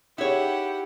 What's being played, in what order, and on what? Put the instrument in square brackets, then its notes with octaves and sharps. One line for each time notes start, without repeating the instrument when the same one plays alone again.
[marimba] D#4 G#4 [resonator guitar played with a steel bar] E4 C#5 [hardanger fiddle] G4 F#5